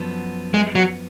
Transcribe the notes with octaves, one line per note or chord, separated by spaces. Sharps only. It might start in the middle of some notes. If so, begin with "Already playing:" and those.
Already playing: F#2 F3 B3 F#4 A4
G#3
F#3